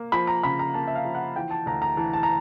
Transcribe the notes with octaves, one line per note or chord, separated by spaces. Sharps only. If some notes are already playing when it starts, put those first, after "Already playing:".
Already playing: A#3
F3 B5
A#5
C#3 B5
A#5
A#3 A5
E5
F5
F3
F#5
E3 G5
A5
D2 A#5
A#5
E3 A5
A5
A#5